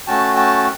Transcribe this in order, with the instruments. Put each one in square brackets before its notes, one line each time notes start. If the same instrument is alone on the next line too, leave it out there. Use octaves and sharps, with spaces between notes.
[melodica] A3 C#4 F#4 G5 A5
G5 A5